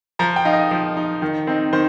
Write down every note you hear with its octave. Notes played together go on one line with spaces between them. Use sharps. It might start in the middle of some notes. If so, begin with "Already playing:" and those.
F3 A#5
G5
D#4 F5
D#5
F3
D#4
D#3
C4 D#4
D#3 C5